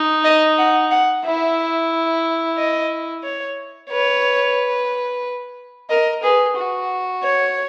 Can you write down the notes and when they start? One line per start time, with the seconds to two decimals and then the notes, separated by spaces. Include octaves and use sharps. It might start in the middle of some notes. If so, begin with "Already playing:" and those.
Already playing: D#4
0.25 D#5
0.58 F#5
0.91 F#5
1.24 E4 E5
2.58 D#5
3.24 C#5
3.90 B4 C#5
5.90 A#4 D#5
6.23 G#4 B4
6.56 F#4
7.23 C#5